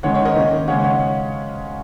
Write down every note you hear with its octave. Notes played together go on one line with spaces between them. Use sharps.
D#3 G#3 C#4 C#5 F#5
C#5 F#5
A#4 D#5
D#3 A#3 C#4
C#3 G#3 C#4 C#5 F#5
C#5 F#5